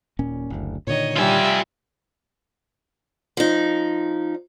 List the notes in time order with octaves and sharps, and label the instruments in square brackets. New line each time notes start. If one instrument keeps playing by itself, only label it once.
[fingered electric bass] D#1 A#2 C#4
F#1 D2
[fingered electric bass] A#2 D3 D#3 [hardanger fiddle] C#5 D#5
[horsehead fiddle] G3 [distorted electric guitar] F4 G#5 [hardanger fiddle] E5
[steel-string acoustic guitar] F3 D#4